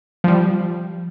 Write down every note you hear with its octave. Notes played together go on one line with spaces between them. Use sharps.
F3 G3